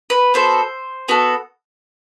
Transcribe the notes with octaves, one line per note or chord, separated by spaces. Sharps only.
B4
B3 F#4 A4 C5
B3 F#4 A4